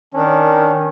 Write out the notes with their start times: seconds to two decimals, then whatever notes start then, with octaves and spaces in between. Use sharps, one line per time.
0.14 D#3 C#4 D4